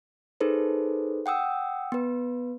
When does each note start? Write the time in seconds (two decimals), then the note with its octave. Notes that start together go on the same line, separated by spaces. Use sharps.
0.41 D#4 G#4 A4 B4 C5
1.26 F#5 G5 D#6 E6
1.92 B3 B4